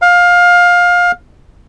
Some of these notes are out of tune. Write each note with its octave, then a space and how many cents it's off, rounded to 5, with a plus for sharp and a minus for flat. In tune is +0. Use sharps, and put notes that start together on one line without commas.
F5 +20